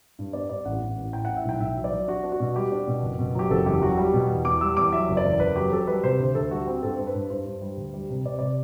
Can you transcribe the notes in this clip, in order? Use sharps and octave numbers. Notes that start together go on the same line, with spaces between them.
G2
B3 D5
G2 D5
A1 F#5
A1
A1
A2 G5
A2 F#5
E5
B1 G5
B1 E5
F#3
D5
F#3
D4 F#4
D4
F#4
B2
G3 G4
D4
B2
F#1
B2
F#3 G4
F#1 A4
E2 G4
F#3 F#4
G3 G4
B2
E2
E2 D6
G3 E6
E2 D6
F#3 E5
F#1
D5
E2
F#1 B4
F#3 G4
F#3 A4
G3 B4
C3 C5
D2
D2 A4
G3 F#4
C4
G2 A4
G2 C5
B4
G2
G2 C5
G2
G3
D2
G3
C3
C3 D5
C3 D5